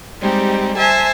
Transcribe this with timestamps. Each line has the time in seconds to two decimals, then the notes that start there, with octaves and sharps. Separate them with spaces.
0.22 G3 G#3 C4 D#4 G4
0.77 C5 E5 G#5 A5